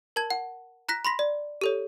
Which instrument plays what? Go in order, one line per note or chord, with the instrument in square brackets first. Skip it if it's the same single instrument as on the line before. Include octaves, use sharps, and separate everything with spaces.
[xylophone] A#4 A5 G#6
F#5
A#5 F#6 A#6 B6
B5 C6 A#6 B6
D5
G4 A4 C#5